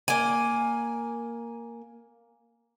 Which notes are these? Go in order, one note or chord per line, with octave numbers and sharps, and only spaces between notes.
A#3 G#5